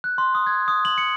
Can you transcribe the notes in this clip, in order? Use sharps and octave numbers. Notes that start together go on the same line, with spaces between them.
F#6
C6
D#6
G#6
D#6
F#7
C#7